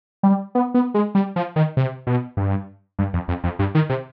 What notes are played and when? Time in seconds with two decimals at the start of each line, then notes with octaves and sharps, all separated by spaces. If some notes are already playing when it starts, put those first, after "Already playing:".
0.23 G3
0.55 B3
0.74 B3
0.94 G#3
1.15 G3
1.36 F3
1.56 D#3
1.77 C3
2.07 B2
2.37 G2
2.99 G2
3.13 F2
3.28 F2
3.44 F2
3.59 G2
3.75 D#3
3.89 C3